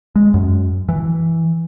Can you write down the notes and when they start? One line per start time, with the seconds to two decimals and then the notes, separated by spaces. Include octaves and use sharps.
0.16 G#3
0.34 F#2
0.89 E3